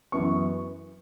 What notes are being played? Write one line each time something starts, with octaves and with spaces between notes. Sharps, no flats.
F#2 E3 B3 C#6